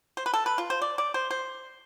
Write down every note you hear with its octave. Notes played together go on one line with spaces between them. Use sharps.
C5
B4
A4
B4
F4
C5
D5
D5
C5
C5